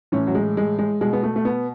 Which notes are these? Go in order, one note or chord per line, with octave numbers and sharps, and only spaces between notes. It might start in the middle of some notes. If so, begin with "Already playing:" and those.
A2 E3 C#4
F#3
G#3
G#3
G#3
B2 G#3
B3
A3
A3
B3